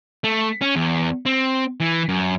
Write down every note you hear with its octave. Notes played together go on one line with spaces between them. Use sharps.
A3
C#4
E2
C4
E3
F#2